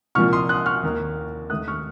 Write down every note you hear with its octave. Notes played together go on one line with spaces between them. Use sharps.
C2 A#2 F3 A#3 C#6 F6
C6 D#6
D#6 F#6
C#6 F6
D#2 D#3 A#3
D#2 D#3 A3 D#6 F#6
C#6 F6